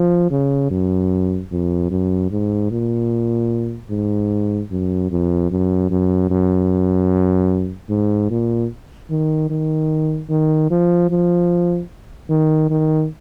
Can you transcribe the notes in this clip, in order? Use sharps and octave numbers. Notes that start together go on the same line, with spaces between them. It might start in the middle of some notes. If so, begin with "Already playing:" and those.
Already playing: F3
C#3
F#2
F2
F#2
G#2
A#2
G#2
F#2
F2
F#2
F#2
F#2
G#2
A#2
D#3
D#3
D#3
F3
F3
D#3
D#3